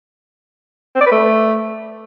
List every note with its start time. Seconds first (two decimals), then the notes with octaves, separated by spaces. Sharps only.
0.96 C4
1.01 D5
1.06 B4
1.12 A3